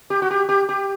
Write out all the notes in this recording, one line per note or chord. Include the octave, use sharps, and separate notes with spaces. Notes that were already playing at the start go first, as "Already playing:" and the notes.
G4
F#4
G4
G4
G4